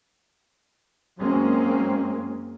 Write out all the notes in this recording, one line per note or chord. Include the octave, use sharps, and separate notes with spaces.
F#2 F#3 G#3 A#3 C4 C#4